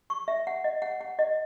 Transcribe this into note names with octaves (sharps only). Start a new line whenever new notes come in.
C#6
E5
F#5
D#5
F#5
F#5
D#5